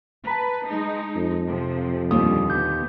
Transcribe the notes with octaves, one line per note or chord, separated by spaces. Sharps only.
B4 A5 A#5
G#3 D#4
F2
C3 F3
D#2 A#2 D3 G3 D#6
B3 D6 G6